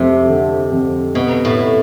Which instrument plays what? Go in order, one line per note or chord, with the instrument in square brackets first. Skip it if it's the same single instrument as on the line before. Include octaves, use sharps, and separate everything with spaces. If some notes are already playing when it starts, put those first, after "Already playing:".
Already playing: [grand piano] F2 A3 [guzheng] C3
[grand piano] D3
F2
[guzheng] B2 [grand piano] B3
[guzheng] A2